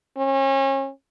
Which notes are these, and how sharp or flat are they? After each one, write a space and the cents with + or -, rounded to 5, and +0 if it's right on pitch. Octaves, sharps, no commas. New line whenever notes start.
C#4 -35